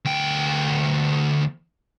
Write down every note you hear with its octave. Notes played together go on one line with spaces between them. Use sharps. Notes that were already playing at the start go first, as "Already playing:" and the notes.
D2 G5